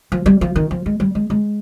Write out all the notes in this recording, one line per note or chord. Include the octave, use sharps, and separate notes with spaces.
F3
G3
F3
D#3
F3
G#3
G3
G#3
G#3